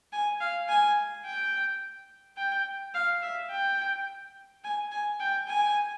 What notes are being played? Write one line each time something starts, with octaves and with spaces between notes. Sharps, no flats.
G#5
F5
G#5
G5
G5
F5
E5
G5
G#5
G#5
G5
G#5